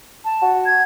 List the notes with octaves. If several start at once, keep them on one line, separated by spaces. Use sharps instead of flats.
A5
F#4
G#6